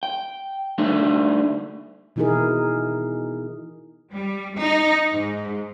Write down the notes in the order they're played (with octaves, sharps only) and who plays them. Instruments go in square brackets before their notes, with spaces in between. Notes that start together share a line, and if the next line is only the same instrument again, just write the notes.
[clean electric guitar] G5
G3 A3 D4 D#4
[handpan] B2 E3 D#4 E4 G#4 A#4
[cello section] G3
D#4
G#2